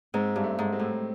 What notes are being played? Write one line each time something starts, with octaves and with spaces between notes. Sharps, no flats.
G#2 C4
G2
A3
G#2
C4
A2